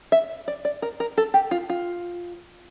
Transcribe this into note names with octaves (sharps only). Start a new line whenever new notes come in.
E5
D5
D5
A#4
A#4
A4
G4
F4
F4